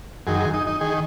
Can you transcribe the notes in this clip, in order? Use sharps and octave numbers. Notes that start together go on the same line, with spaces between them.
F#2 D#3 G#4
G#4
D#4
D#4
D#3 G#4